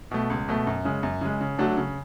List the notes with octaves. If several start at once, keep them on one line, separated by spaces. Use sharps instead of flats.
B2 A3
C#2
B2 A3
F#2
C#3 G#3
F#2
C#3 G#3
C#3
F#3 A3 D4 F#4
C#3